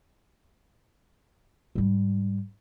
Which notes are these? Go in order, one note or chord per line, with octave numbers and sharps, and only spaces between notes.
G#2 G3